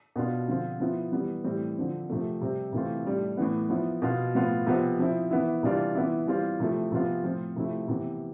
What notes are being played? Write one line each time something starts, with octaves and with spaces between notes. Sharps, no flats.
B2 B3 D4 F4
D3 F3 C4 F4
F3 B3 E4
E3 G3 B3
A2 E3 G3 C4
D3 F3 C4
C3 F3 A3 C4
C3 G3 C4
C3 E3 A3 C4 F4
A2 G3 D4
A2 E3 B3
F3 B3 E4
B2 B3 F4
A2 F3 B3 F4
C3 F3 B3
F3 C4 E4
E3 B3 E4
C3 E3 G3 D4 F4
E3 B3 E4
E3 G3 C4 F4
C3 F3 A3 E4
C3 F3 B3 F4
A2 F3 C4
C3 F3 A3 E4
C3 E3 B3